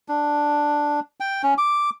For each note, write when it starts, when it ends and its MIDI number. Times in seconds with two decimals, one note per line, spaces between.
0.08 1.00 62
1.20 1.42 79
1.43 1.54 61
1.58 1.90 86